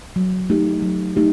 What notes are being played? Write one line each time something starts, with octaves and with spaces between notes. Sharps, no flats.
F#3
A3 D#4 G4
F#3
A3 D#4 G4